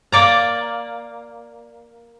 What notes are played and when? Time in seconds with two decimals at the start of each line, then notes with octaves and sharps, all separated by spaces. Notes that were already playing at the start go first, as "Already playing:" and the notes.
0.12 A#3 D5 A#5